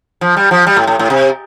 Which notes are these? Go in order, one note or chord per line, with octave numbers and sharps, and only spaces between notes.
F3
G3
F3
G3
A2
A2
A2
C3